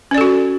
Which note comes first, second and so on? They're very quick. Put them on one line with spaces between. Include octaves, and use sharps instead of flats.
C#4 D5 A4 F#4